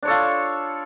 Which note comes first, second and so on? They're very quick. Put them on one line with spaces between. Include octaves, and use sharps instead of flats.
D4 C#5 A4 F4